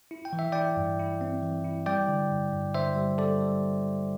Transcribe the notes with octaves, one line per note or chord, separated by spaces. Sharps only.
E4
G5
E3
E5
E4 D5 G5
G2
E4
C4
E3
E4
G3 D5 G5
D3
G2
G2
D3 C5 E5
G3
G3 A4 D5
G3